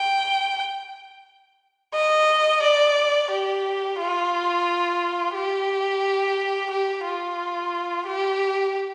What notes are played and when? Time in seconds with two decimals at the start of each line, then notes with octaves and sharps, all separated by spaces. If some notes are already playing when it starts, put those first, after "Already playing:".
Already playing: G5
1.94 D#5
2.62 D5
3.31 G4
3.99 F4
5.35 G4
6.70 G4
7.04 F4
8.07 G4